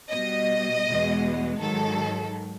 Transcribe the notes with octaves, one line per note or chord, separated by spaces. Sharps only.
B2 G3 D#5
E2 B2 G#3
G#2 D#3 F#3 A4